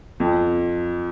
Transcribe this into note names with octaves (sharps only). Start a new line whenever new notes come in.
F2